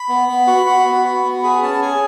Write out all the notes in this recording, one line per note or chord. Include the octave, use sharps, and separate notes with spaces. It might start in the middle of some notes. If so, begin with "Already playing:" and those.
Already playing: B5
B3
B3
F#4
F#4
B3
F#4
B3
G#4 B5
C#4 A5
G#4 G#5